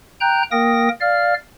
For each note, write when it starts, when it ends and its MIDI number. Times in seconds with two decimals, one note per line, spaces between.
0.21 0.43 79
0.21 0.43 82
0.21 0.43 90
0.21 0.43 91
0.51 0.89 58
0.51 0.89 70
0.51 0.89 79
0.51 0.89 87
0.51 0.89 94
1.01 1.34 74
1.01 1.34 77
1.01 1.34 89